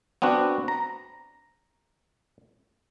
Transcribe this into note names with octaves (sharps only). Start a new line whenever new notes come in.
B3 C4 D4 F#4
A#5